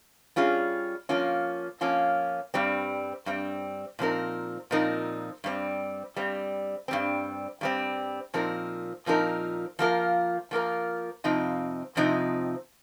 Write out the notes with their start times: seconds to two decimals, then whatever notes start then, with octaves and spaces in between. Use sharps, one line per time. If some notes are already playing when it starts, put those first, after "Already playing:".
0.36 G3 C#4 F4 G#4
1.09 F3 A#3 C#4 F4
1.81 F3 A#3 C#4 F4
2.54 G2 G3 C4
3.26 G2 G3 C4
3.99 A#2 F3 C4 D#4 A#4
4.71 A#2 F3 C4 D#4 A#4
5.44 G2 G3 C4
6.16 G2 G3 C4
6.88 G2 G3 C4
7.61 G2 G3 C4
8.34 A#2 F3 C4 D#4 A#4
9.06 A#2 F3 C4 D#4 A#4
9.79 F3 A#3 F4 A#4
10.51 F3 A#3 F4 A#4
11.24 F2 C3 F3 C4 D#4
11.96 F2 C3 F3 C4 D#4